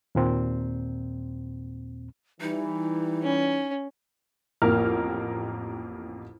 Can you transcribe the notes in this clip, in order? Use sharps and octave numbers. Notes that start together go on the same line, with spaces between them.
D#2 A#2 C4
E3 G3 D#4
C#4
A1 F2 A#3 A#4 F6